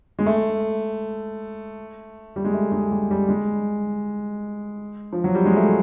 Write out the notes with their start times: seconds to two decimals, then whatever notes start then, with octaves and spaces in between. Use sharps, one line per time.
0.19 G#3
0.26 A3
2.36 G3
2.45 G#3
2.54 A3
2.72 G#3
2.91 G3
3.11 G3
3.29 G#3
5.12 F3
5.24 F#3
5.35 G3
5.45 G#3
5.56 A3